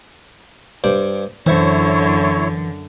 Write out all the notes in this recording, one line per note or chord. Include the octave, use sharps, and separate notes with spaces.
G2 C5 D5
F#2 D3 E3 E4 C5 C#5 E5 C#6